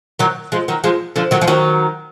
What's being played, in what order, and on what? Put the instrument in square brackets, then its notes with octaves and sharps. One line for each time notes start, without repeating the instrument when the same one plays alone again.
[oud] D#3 F#3
F3 G#3
D#3 F#3
F3 G#3
D3 F3
D#3 F#3
F3
D#3 F#3